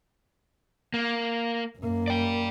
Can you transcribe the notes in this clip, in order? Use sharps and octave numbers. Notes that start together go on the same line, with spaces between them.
A#3
F#2 A#3
D5 G5